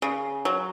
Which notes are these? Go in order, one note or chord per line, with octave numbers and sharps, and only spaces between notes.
C#3
F#3